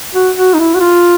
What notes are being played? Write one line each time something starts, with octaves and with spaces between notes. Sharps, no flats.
F#4
F#4
D#4
E4
F#4
F4